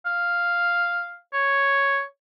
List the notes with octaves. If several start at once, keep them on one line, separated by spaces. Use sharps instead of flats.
F5
C#5